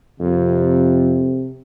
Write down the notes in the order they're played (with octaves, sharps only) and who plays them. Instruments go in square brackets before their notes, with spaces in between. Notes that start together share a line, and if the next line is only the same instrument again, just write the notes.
[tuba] F2 [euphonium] C3